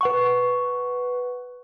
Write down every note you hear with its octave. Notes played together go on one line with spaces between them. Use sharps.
B4 F#5 C#6